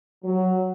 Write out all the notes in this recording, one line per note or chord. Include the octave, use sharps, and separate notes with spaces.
F#3